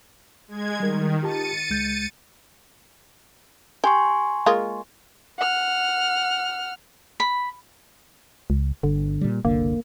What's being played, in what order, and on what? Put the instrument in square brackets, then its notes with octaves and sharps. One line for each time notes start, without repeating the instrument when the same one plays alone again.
[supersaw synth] G#3 G#6
[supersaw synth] D#3 [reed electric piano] G3 A#4
[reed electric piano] F4 G4 A5 [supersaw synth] A6 C#7 D#7
[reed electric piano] C#2 G#3 G6
[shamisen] G4 [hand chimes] G#5 C6 C#6
[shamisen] G#3 A#3 F4
[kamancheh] F#5 F6
[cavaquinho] B5
[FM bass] C#2
[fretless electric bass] G1 [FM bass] D3
[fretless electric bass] A#2 G3
[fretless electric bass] F#1 C2 D3 [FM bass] A#3